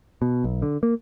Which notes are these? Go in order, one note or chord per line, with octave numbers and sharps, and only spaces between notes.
B2
B1
D3
A#3